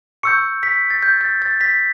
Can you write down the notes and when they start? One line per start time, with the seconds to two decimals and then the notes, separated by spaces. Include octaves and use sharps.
0.23 C#6 E6 G6 C#7
0.63 B6
0.90 A6
1.03 G6
1.21 A6
1.42 A6
1.61 B6